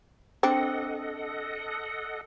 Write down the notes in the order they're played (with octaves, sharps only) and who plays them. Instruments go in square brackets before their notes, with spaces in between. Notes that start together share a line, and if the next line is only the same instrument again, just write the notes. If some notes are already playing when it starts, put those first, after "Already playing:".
[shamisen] C4 D4 [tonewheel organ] A4 D#5 F#5